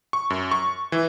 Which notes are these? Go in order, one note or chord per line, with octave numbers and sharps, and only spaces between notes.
C#6
F#2
C#6
E3